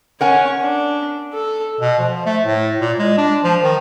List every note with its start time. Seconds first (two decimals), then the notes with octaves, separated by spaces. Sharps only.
0.21 C#4 A#4 C#5 F#5 G#5
0.61 D4
1.34 A4
1.81 B2
1.99 F3
2.26 A3
2.44 A2
2.81 A#2
2.99 G#3
3.18 D4
3.44 F3
3.63 D#3